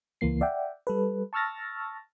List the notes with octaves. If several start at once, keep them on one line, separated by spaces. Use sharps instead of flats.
C#2 E3 A#3 C7
D5 E5 F#5 G5
G3 A4 B4
A5 C#6 E6 F6 A6 A#6